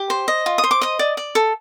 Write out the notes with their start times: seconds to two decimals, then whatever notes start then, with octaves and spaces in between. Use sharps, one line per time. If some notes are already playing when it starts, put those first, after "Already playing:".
Already playing: G4
0.10 C5
0.28 D#5
0.46 F4
0.58 D#6
0.64 C5
0.71 D6
0.81 D#5 D#6
0.99 D5
1.17 D5
1.35 A4